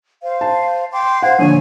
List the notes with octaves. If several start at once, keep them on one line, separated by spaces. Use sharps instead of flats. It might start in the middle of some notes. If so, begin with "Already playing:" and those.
C5 F5
A5
G5 C6 D6
C5 F5 F#5 G#6
A#1 D3 C#5 G#5